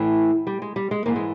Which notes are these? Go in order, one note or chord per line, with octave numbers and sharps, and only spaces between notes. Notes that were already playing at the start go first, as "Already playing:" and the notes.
Already playing: A2 E3 A3
G3
G#3
G3
G#3
G#2 E3 A#3
G#3